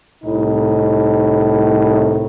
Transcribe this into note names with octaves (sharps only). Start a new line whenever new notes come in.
C2 A2 D#4